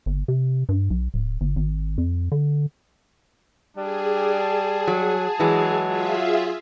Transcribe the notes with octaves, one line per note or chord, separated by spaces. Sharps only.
G1
C3
G2
B1
D1
G1
G#1
F2
D3
G3 D4 G#4
A5
F#3
E3 F#3 G#3
F4 G#4 E5